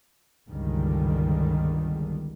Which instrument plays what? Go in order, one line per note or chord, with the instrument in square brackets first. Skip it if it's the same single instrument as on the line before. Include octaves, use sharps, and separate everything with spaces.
[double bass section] G1 C#2 D3 D#3 G3